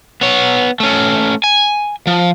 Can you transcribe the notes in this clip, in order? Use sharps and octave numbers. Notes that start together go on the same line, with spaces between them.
B3 C#5
A3 C#4
G#5
F3